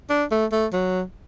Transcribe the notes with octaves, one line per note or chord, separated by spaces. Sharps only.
D4
A3
A3
F#3